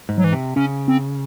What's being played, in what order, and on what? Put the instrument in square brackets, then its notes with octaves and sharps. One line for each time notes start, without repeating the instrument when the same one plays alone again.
[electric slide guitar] G#2
[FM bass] F#3
E3
[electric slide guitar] C3
[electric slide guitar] C#3 [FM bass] C#4
[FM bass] C4